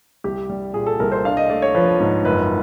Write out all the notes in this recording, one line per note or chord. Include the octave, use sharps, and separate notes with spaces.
C2 G4
G3
A#2 G#4
A4
C2 A#4
C5
D4 F5
D#5
A3 D5
C#5
F3 B4
G#2
F#1 B4